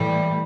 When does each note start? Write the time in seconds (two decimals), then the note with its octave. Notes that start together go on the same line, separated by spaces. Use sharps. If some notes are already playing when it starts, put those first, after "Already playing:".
Already playing: A2 E3 G3